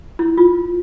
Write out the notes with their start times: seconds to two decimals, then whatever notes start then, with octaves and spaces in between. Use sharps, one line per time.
0.19 E4
0.37 F4